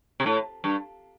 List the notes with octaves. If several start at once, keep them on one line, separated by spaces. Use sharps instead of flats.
C3
A2
G2